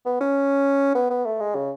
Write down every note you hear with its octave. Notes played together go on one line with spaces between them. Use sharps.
B3
C#4
B3
B3
A3
G#3
C#3